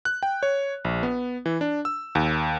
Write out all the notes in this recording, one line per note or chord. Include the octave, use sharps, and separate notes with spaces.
F#6
G5
C#5
A#1
B3
E3
D4
E6
D#2